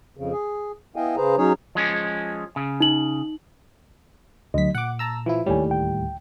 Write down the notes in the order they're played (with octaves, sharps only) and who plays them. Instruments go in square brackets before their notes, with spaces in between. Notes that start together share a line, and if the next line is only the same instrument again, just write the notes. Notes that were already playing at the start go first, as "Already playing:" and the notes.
[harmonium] F2 C#3
G#4
B3 E4 D#5 F5 G5 G#5
C#3 G#4 B4 C5 A#5
F#3 C#4 D#4 G#4 C#5
[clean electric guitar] F3 G#3 C#4
C#3
[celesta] D#4 F#7
[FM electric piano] D2 B6 [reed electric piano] F#3 D#5
[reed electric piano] A#2 [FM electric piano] F#5 D6
[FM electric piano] A5 A#5 E6
E3 F3 E4
[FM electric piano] D#2 A2 G3 [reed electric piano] C#5 G#5
[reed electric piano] D2 G5